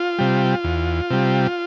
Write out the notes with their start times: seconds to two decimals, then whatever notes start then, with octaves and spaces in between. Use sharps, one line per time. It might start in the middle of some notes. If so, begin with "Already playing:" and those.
Already playing: F4
0.19 C3 G3
0.64 E2
1.10 C3 G3